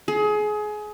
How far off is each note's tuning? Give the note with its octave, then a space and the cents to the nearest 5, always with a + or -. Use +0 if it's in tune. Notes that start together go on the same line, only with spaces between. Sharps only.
G#4 +25